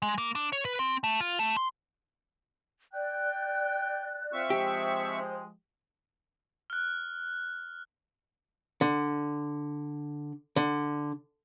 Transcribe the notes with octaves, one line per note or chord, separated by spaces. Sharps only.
G#3
A#3
D4
C#5
B4
C4
A3
F4
A3
C6
D5 G5 F#6
C4 F4 E5 C#6
F3 G#3 G4 C5
F6 F#6
D3
D3